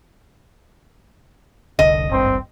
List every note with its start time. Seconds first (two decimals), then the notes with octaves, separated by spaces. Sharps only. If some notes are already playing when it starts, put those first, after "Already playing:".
1.79 F1 C2 D3 D#5
2.12 D1 G#1 G2 C4